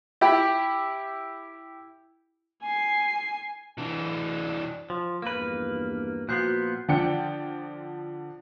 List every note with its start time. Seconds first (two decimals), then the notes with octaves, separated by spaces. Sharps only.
0.21 E4 G4 E5 G5 B5
2.62 G#5 C7
3.78 E3 D4
4.90 F3
5.22 A#1 E2 G2 A#3 B4 F6
6.29 A#2 F3 B3 F#4 F#6 G6 C7
6.88 D3 F3 D5 G5 C#7